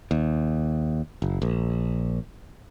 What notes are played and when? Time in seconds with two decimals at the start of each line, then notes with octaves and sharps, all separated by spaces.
0.11 D#2
1.22 F#1
1.42 A#1